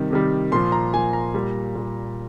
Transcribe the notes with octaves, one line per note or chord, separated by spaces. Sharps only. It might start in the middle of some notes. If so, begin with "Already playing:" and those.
Already playing: C3 D#3 G3
C3 D#3 G3
A#2 F3 C6
A#5
A#2 F3 G#5
A#5
A#2 G3
A#2 G3